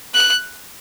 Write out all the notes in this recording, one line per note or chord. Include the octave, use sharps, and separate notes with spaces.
F#6